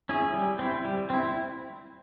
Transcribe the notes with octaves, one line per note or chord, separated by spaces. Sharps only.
C#4 E4 G#4
G3
C4 E4
G3
C4 E4